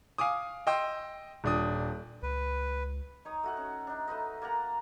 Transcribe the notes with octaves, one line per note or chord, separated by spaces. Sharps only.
F5 G#5 D6 D#6
D#5 G5 C6 E6
D#1 D4 D#6
C#2 B4
D#4 C#5 D#6
A3 F#4 F#5
C#4
D4 D#4
A3 D#4 B4 D#5
A#3 D5 F#5 A#5